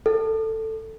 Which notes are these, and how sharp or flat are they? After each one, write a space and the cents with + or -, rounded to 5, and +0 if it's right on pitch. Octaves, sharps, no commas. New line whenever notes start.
A4 +10